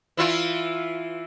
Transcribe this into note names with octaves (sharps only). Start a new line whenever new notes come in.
E3 E4 F4